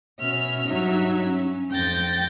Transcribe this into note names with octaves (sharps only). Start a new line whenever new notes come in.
B2 C#4 E5 F6
G2 F#3 D#4 E5
C#4
F2 G5 G6 A6 A#6